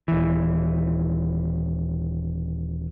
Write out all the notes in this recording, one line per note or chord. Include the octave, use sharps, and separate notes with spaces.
D#1 E3